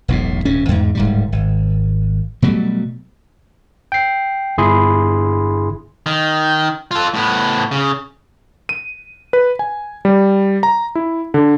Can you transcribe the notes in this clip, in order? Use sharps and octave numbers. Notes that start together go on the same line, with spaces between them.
E1 B1 A2
D#1 G#2 C#4
E2 G#2
D1 G#2 G3
G#1
B2 F#3 G3 A3
G5 C7
G1 E4 G#4 B5 C6
D#3
F4 A4
A2 B3
C#3
D#7
B4
G#5
G3
A#5
E4
D3